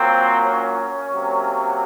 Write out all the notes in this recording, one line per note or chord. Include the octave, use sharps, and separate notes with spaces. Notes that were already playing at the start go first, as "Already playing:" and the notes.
Already playing: A#2 F#3 A#3 C4
C#4
C3 F#3 A#3